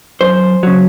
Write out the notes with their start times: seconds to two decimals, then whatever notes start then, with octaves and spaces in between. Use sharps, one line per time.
0.21 F#2 C5
0.63 C#3 F#3